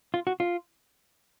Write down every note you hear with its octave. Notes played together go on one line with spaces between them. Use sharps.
F4
F#4
F4